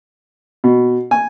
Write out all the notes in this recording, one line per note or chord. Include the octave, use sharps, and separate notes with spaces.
B2
G#5